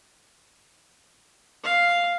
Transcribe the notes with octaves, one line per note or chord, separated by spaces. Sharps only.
F5